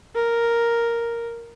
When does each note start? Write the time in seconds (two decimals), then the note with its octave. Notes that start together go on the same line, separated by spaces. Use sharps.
0.15 A#4